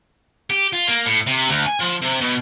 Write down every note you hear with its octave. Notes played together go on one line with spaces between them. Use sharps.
G4
F4
A#3
A2
C3
D2
G#5
F3
C3
B2